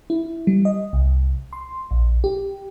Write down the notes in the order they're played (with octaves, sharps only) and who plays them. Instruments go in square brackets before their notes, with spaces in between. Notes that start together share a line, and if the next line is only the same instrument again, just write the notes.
[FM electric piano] E4
G3
D#5
C2
C6
A#1
G4